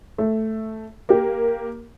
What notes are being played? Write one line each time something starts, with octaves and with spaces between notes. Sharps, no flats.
A3
A#3 G4